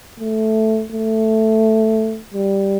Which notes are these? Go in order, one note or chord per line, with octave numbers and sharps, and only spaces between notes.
A3
A3
G3